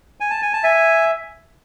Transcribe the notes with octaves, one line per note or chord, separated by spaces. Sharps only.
G#5
A5
G#5
A5
E5 G#5